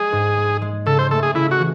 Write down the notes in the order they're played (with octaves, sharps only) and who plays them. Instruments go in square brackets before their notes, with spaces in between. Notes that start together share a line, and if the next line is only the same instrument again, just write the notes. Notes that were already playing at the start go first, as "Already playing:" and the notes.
Already playing: [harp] G#3 [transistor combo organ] G#4
[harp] G#2
G#3
G#3
[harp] C#3 [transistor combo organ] A4
[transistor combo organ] C5
[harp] A3 [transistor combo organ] A4
[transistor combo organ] G#4
[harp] C#3 [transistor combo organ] E4
[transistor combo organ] F#4
[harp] E3